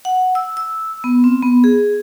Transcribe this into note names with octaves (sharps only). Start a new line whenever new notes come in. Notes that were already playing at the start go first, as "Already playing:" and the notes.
F#5
E6
E6
B3
C4
B3
G#4